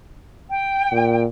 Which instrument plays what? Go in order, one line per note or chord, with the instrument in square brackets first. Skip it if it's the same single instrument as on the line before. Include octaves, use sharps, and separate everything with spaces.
[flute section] G5
[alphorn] A#2